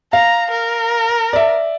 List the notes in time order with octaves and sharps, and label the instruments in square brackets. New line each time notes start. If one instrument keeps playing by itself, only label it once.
[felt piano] F5 [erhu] A#5
[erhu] A#4
[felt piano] D5 E5